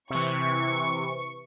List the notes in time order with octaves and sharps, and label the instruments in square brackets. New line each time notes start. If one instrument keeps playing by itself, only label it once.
[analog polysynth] C3 E3 [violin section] C#6